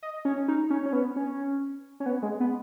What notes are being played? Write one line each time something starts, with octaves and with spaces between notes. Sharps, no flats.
D#5
C#4
D#4
C#4
C#4
B3
C#4
C#4
B3
G#3
B3